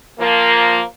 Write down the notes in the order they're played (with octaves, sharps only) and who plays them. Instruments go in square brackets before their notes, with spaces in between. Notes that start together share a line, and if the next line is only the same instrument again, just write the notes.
[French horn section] F3 A#3